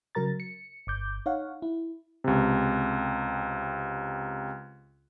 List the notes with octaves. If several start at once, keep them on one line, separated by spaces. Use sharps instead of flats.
C#3 F#3 A#4 A#5 A6
C#7
G1 D6 G6
D#4 C#5 F5 F#5
E4
C#2 C3